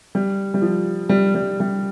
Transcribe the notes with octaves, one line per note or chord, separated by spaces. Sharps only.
G3
G3
F3
G3
G3
G3